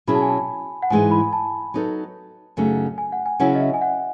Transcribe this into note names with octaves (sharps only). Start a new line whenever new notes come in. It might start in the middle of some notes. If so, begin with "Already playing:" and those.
B2 F#3 C#4 E4 G#4 B5
A5
G#5
A5
F#5
G#2 E3 G#3 D#4 G#5
B5
A5
F#3 B3 D#4 A4
F#2 C#3 F#3 A3 D#4
G#5
F#5
G#5
C#3 F#3 C#4 E4 F#5
D#5
E5
G#5
F#5